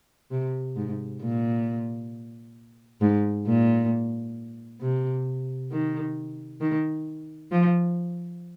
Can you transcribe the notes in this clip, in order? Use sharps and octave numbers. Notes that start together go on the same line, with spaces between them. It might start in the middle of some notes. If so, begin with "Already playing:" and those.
C3
G#2
A#2
G#2
A#2
C3
D#3
D#3
F3